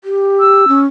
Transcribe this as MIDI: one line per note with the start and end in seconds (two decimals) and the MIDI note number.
0.04 0.68 67
0.40 0.79 88
0.68 0.86 61